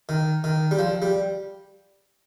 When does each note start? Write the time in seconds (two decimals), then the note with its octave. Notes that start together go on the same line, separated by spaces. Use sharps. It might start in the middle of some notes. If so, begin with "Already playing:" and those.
0.09 D#3
0.44 D#3
0.71 G3
0.79 F3
1.02 G3